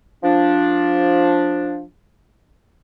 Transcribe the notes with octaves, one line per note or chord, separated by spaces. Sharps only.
F3 D4